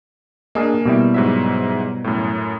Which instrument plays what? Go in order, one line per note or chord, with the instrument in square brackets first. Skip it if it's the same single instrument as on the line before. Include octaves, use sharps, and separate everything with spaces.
[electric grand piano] A#3 [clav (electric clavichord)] D4 G#4 D#5
[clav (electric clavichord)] B2 G3 E4
[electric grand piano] G#2 F#3 E5
F#2 A2